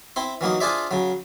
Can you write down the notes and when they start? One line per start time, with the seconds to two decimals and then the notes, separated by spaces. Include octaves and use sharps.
0.16 C4 E4 C6
0.41 E3 F#3 A#3 D#4
0.60 D4 F4 G#4 C5 D5 E5
0.91 C#3 F#3